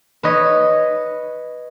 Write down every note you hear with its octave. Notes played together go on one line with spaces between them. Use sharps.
B4 C#5 D#5